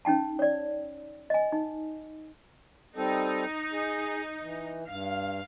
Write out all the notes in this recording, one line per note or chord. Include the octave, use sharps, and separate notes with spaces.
C#4 D#4 G5 A5
C#5 D5
D#5 G#5
D#4
G3 C4 D#4 A4
G#4
E3
G2 F5